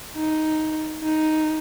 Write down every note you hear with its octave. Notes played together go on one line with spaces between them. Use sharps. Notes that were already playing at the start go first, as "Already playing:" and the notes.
D#4
D#4